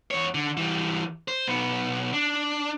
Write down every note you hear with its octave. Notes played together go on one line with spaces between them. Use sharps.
E2 C#5
D3
E3 G3
C5
B1 B3
D4